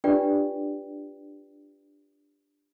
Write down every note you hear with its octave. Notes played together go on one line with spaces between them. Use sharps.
D4 F4 G4 B4 D5 G5